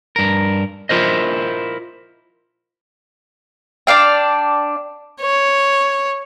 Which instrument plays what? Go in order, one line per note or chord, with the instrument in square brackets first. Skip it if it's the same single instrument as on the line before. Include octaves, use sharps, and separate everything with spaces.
[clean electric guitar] G2 A#4
E4 F4 A#4 C5 D#5
[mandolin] D4 D5 F5 G5
[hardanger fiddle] C#5